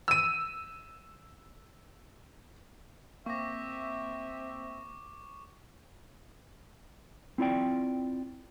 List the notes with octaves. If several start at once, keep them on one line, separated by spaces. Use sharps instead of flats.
E6 D#7
A#3 C4 E5 C#6 D6 A#6
C4 E4 F4 D5 G5